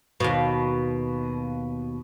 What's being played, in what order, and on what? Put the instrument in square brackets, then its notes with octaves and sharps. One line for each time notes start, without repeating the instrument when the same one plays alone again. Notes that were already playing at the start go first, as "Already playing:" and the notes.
[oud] D#2 B2